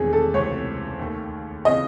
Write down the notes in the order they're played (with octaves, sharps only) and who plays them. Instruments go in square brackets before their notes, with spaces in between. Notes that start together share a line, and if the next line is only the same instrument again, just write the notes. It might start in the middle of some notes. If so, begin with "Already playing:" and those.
Already playing: [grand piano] E1 E2 D#3 A3 C#4 [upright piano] G#4
[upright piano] A4
[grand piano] C#2 C3 E3 A3 [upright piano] C#5
[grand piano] D#2 D#3 A3
[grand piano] C#3 E3 [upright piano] D#5